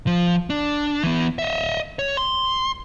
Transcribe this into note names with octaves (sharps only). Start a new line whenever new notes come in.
F3
D4
E3 B3
D#5 E5
C#5
C6